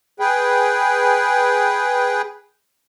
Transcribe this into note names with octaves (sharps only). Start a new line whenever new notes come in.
G#4 B4 G5